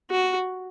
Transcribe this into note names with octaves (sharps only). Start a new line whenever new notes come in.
F#4